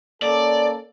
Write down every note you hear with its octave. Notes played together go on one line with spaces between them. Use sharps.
A#3 C#4 A4 D5